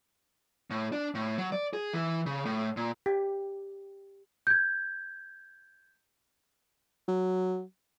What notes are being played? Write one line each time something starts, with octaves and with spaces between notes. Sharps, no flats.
A2
D4
A2
F#3
D5
G#4
E3
C#3
A2
A#2
G4
G6 G#6
F#3